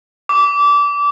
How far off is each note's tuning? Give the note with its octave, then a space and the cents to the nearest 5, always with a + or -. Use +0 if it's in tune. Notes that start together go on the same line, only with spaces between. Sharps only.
D6 -25